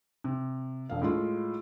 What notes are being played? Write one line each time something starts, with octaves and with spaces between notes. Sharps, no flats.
C3
E1 F5
A2 G#3 F4